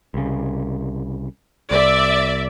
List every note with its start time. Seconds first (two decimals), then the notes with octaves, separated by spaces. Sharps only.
0.14 C2 C#3
1.71 C2 D5 E5